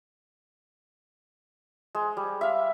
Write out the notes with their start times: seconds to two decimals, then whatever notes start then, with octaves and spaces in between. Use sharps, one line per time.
1.95 G#3
2.17 G3
2.41 E5 F5